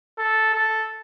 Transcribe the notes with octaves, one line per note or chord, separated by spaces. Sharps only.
A4
A4